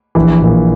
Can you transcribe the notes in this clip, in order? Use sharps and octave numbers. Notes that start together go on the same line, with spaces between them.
A#1 E3
A#2